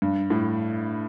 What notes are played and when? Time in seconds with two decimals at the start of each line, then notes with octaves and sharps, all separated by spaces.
0.02 G2
0.30 A2